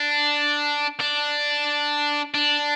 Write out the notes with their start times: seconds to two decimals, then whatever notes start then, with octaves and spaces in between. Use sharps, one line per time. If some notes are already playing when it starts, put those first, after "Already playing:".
Already playing: D4
1.00 D4
2.34 D4